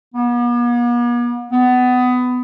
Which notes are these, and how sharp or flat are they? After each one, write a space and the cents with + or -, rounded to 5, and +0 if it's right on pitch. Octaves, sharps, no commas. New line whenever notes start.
B3 -45
B3 +20